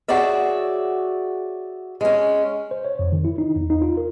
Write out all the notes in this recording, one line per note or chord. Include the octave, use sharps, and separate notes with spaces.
F#4 G#4 C#5 D5 E5
G#3 C#4
C5
C#5
F2
D#3
E4
D#4
E2
D#4
F4
A#4